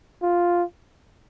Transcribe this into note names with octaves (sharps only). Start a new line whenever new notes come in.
F4